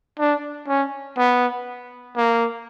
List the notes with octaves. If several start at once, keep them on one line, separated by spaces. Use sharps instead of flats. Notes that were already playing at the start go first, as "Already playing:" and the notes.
D4
C#4
B3
A#3